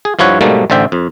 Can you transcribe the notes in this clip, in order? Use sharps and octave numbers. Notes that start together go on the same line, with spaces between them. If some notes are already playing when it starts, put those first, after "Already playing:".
G#4
G2 F3 E4 C#5 F#5
G#2 B2 G3 A3 A#3
A1 D3 C5 E5 G5
F2